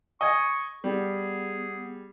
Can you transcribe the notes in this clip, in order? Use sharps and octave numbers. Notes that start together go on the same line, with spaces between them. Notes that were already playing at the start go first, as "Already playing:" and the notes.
D#5 G#5 C#6
G3 B3 G#4